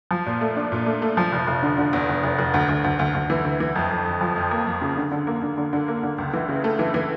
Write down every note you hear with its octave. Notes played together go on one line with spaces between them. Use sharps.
F3
A#2
A3
D4
A#2
A3
A3
F3
F1
F1
D3
D3
E2
F1
F1
F1
D2
D2
D2
D2
D2
E3
D2
E3
F2
F2
F2
F3
F2
A#3
F2
C#3
D3
D3
A#3
D3
D3
D3
A#3
D3
C#2
E3
C#3
A3
E3
E3